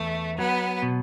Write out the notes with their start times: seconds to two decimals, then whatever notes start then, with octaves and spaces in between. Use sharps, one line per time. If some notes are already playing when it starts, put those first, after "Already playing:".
Already playing: E2 A3
0.38 F#3 B3
0.82 B2